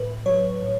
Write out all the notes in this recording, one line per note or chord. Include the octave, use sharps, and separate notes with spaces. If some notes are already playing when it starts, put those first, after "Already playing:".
Already playing: A2 B4
F#3 C#5
A2